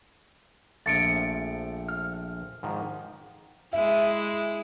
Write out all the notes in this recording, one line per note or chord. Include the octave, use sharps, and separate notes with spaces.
A#1 F3 A3 A6 C#7 D7
F6
G#2 D#3 F3
G#3 E4 E5